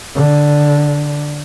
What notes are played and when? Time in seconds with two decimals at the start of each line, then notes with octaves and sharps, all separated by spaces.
0.15 D3